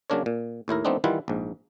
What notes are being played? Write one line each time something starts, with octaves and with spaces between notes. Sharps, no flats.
C#3 F#3 A#3 D4 A#4 C#5
A#2
D#2 A2 E4 A#4
F3 A3 B3 C4 D4 D#4
D#3 E3 G3 E4 F4 F#5
A#1 G#2